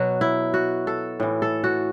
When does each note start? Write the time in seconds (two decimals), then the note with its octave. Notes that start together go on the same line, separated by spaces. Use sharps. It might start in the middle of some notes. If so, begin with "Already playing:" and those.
Already playing: B2 F#3 F#4
0.21 E4
0.54 F#4
0.87 A4
1.20 A2 E3
1.42 A4
1.64 F#4